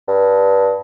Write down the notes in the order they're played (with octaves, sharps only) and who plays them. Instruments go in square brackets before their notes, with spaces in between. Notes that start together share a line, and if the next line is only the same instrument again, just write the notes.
[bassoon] G2